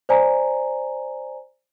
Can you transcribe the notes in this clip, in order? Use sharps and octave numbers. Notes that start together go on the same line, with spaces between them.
C5 D5 G#5 A#5